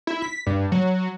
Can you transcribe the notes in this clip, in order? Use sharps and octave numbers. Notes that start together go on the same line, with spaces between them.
E4
B6
G2
F#3